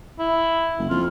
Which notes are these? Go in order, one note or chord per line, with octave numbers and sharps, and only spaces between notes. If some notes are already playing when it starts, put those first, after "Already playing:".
E4
F#1
F2 F4